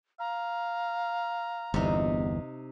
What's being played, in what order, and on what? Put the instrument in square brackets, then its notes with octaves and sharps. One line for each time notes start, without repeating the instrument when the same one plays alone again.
[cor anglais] F5 [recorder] A#5
[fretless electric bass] G1 E2 [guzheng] C3 D#4